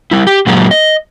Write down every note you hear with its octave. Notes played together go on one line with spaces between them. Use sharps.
G3 E4
G4
A#2 F#3 G#3 A#3
D#5